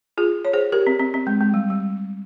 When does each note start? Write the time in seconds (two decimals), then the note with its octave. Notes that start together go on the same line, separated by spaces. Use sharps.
0.17 F4 G#4
0.45 C#5
0.53 G#4 C5
0.72 G4 A#4
0.87 C4
0.99 C4
1.14 C4
1.27 G#3
1.41 G#3
1.54 G3
1.70 G3